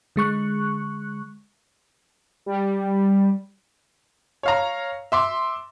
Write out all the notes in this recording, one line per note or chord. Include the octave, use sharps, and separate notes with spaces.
D3 G#3 C#6 F#6
G3
C#5 F5 A#5
E5 C6 D6